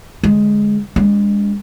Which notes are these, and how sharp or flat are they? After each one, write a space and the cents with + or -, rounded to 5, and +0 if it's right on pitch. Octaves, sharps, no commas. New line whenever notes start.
D3 -5 G#3 +0
G#3 -30 C#4 +45